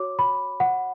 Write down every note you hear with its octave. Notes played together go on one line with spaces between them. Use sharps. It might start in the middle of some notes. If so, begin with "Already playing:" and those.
Already playing: F#4 C#5 D6
B5
F#5